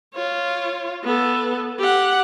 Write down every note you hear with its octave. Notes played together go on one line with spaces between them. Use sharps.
F4 C#5
B3 A4
G4 F#5